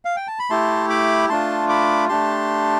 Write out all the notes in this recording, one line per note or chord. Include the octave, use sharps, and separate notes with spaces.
F5
G5
A5
B5
A3 E4 G4 A5 C6
B5 D6
A3 D4 F4 A5 C6
B5 D6
A3 D4 G4 A5 C6